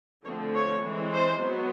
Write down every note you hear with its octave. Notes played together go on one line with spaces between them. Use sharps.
D3 F3 A3 C4 C#5
C#5
E3 G#3 C4
C5
F#3 B3